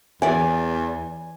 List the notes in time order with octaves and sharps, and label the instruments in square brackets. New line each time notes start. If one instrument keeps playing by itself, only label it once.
[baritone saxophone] E2 [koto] E3 D5 [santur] G#5